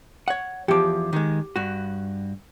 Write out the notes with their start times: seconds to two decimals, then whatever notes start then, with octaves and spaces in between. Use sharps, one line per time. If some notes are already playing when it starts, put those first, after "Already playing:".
0.28 C#5 F#5
0.68 E2 F3 G4 D6
1.13 D#3 G#3
1.56 G2 F#4